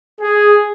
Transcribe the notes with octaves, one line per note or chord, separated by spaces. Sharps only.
G#4